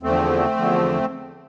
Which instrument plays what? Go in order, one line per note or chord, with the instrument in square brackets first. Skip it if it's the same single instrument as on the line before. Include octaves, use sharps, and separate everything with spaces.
[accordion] E2 D3 F3 A3 C4
E2 D3 F3